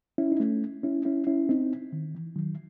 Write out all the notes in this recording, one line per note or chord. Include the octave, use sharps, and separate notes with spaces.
C#4 E4
D#4
A3 C#4
C#4 E4
C#4 E4
C#4 E4
C4 D#4
D#3
E3
D#3 F#3